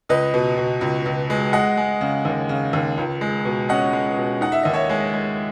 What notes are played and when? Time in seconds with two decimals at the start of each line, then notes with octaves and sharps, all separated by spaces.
0.09 C#2 B4 D#5
0.34 B2
0.57 B2
0.81 C#2
1.06 C#2
1.30 G#3
1.53 G#3 D#5 F#5
1.77 G#3
2.01 C#3
2.25 D#2
2.49 C#3
2.73 D#2
2.98 C#2
3.21 G#3
3.45 B2
3.69 C#4 D#5 F#5
3.93 G#3
4.17 B2
4.41 D#4 F#5
4.52 E5
4.63 D#2 D#5
4.74 C#5 E5
4.90 G#3
5.13 G#3